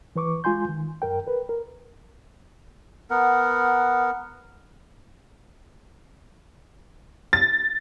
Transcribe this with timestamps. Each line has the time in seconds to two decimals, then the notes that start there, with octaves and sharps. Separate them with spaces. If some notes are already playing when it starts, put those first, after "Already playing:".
0.16 E3 B4 C#6 D6
0.44 G#3 F4 G#5 C6 G6
0.69 D#3
1.02 F#2 A#4 G5
1.27 A#4 B4
1.49 A#4
3.10 B3 A#4 F#5
7.33 A6